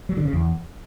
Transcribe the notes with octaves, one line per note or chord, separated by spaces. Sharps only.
F#3
D3
C#3
E2